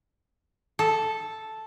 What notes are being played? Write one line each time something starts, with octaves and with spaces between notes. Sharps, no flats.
A4